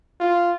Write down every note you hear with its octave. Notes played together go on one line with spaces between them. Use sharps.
F4